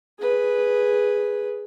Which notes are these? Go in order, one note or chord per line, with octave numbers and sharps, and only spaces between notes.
G#4 B4